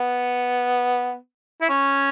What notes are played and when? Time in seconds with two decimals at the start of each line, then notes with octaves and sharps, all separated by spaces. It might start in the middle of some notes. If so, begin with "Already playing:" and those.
Already playing: B3
1.61 E4
1.69 C#4